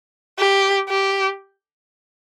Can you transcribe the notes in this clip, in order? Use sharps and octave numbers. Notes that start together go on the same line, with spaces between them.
G4
G4